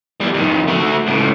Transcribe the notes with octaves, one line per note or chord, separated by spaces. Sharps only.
E2 G3
F2 D#3
A3 F#4
C#2 A2